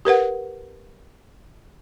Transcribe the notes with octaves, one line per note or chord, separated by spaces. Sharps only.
G4 A#4 B4 F#5